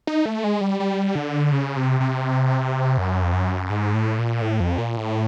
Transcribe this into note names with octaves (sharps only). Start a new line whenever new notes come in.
D#4
A3
G#3
G3
G3
D3
C#3
C3
C3
F#2
F2
F#2
G#2
A2
A#2
A2
F2
A#2
A2